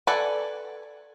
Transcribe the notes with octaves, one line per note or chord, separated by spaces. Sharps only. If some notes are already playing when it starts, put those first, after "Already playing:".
A4 B4 D5 F#5 G#5